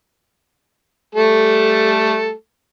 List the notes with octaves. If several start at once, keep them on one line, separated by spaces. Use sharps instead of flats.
G3 A3 A4